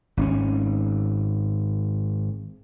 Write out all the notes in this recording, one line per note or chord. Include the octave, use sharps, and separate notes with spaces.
G#1 C4 C#4